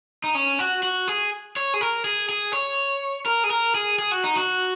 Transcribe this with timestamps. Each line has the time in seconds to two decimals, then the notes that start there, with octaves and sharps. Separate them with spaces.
0.24 D#4
0.35 C#4
0.59 F#4
0.83 F#4
1.08 G#4
1.56 C#5
1.74 G#4
1.81 A#4
2.05 G#4
2.29 G#4
2.53 C#5
3.26 A#4
3.44 G#4
3.51 A#4
3.75 G#4
3.99 G#4
4.11 F#4
4.24 D#4
4.36 F#4